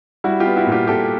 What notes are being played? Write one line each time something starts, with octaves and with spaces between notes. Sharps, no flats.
G3 E4 F#4
F4 G4
B3
E4 F#4
A#2
F4 G4
A#2 G4 A4